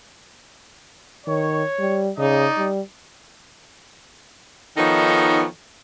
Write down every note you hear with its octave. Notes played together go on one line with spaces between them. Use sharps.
D#3 C#5
G3
C#3 D#4 D5 D#5
G3
D#3 F3 B3 D#4 A4 C#5